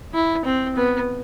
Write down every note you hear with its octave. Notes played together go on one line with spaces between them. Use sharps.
E4
C4
B3